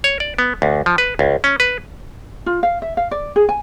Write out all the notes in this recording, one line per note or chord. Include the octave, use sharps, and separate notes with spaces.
C#5
D5
B3
D2
F3
B4
C#2
C#4
B4
F4
F5
E5
F5
D5
G#4
G#5